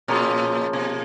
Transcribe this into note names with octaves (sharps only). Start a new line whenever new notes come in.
A#2 C#3 F3 A#3
B2